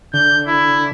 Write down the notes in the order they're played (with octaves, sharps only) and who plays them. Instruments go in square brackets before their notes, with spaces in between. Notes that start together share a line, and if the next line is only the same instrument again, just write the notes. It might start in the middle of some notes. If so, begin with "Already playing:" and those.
[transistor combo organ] D3 [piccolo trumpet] G6
[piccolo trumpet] E4